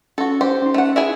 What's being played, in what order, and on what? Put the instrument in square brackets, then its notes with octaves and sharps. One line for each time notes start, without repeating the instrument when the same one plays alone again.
[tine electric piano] C#4 [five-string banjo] F#4 A4
[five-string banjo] G4 C5
[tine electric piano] C#4 D#4
[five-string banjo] A3 F#5
E4 G#4 G#5